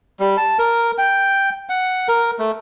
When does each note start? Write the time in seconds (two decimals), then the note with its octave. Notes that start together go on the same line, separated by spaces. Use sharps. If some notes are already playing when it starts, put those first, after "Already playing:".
0.20 G3
0.37 A5
0.59 A#4
0.98 G5
1.69 F#5
2.08 A#4
2.39 A3